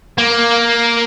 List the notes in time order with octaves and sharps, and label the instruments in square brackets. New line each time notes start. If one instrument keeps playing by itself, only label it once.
[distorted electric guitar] A#3